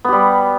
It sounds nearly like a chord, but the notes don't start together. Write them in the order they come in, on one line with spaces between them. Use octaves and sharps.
B3 G4 G3